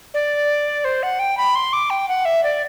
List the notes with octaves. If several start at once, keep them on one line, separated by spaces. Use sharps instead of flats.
D5
C5
F#5
G5
B5
C6
D6
G5
F#5
E5
D5